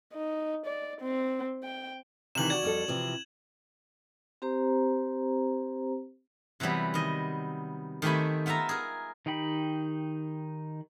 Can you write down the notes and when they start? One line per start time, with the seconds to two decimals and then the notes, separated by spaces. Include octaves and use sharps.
0.14 D#4
0.66 D5
1.01 C4
1.64 G5
2.35 C3 D#3 E3 E7 F#7
2.50 F#4 D5 G#6
2.63 F2 G3 A4
2.88 C3 E3 F3
4.42 C4 G4 C5 A#5
6.60 C3 E3 F#3 G3 B3
6.94 D#3 D#5
8.02 D#3 A3 C4 G4 G#5 B5
8.46 B3 F4 E5 A5 A#5
8.69 G#4 A#4
9.26 D#3 D#4 G4 G5 B5